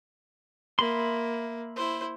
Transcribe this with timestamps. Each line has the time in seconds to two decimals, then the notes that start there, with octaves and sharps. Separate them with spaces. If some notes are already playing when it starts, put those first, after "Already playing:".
0.79 A#3 E5 B5 C6
1.76 E4 C5